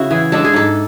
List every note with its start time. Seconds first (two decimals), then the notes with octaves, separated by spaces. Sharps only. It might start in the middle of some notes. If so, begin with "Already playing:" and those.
Already playing: C#3 E4 F#4
0.10 E3 G#4
0.32 G#3 D4 A4
0.44 G#4
0.53 G#2 A4